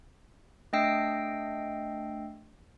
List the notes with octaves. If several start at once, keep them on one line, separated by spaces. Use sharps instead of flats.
A3 D4 D#5 G5 E6 C7